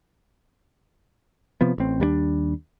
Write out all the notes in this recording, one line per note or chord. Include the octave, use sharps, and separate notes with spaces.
C3 F3 B3
A1 C4
D#2 G3 A#3 D4